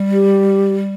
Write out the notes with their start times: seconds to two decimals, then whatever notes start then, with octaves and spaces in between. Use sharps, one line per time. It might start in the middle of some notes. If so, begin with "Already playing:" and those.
Already playing: G3
0.12 G4